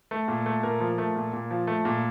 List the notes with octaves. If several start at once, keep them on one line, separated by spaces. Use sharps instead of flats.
A3
A#2
A3
A#2 A#4
F3
A3
A#2
A#2
F3
A3
A#2